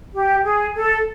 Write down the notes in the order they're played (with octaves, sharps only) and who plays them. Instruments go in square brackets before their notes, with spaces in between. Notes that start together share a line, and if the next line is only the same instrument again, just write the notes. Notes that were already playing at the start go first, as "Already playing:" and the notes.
[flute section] G4
G#4
A4